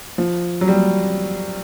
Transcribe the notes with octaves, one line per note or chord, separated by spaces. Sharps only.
F3
F#3
G3